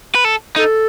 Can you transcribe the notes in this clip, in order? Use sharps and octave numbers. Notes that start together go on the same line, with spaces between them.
B4
A4
D#4 A4